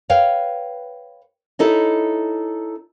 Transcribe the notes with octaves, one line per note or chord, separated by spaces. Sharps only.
B4 C#5 F5 G5
D#4 E4 A4 C#5 D#5